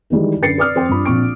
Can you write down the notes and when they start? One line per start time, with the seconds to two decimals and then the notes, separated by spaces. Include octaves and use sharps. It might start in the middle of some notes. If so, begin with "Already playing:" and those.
0.10 D#3 E3 G3 G#3
0.42 F#2 D3 B4 A6 C7 C#7
0.58 B4 D5 D6 D#6 F6
0.75 F2 C5 G5
0.89 G2 F4 B5
1.05 A#1 C4 C#6 D7